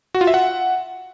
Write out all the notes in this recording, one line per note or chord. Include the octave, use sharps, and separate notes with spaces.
F#4
F4
E5
F#5